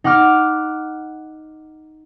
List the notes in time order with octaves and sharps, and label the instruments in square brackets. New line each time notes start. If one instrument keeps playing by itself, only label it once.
[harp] D#4 F#5 D6 F6